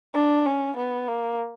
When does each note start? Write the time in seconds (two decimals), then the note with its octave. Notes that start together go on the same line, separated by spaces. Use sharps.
0.14 D4
0.46 C#4
0.76 B3
1.08 A#3